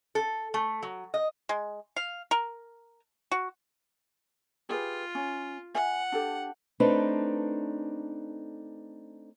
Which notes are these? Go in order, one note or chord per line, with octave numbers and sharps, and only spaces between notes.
A4
A3
F#3
D#5
G#3
F5
A#4
F#4
F4 G4 G#4 B4
C#4
E5 F#5 G#5
D4 G4 A4
A3 C4 D4 D#4 B4